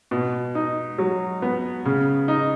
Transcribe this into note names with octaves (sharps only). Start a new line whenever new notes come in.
B2
D#4
F#3
B3
C#3
D#4